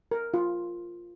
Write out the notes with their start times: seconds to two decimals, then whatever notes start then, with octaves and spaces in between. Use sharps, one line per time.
0.11 A#4
0.34 F4